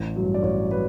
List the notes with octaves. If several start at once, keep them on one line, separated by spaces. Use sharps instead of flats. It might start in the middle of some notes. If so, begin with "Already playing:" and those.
Already playing: A1
G2 F#3
D5
A1 C#5
F#3 B4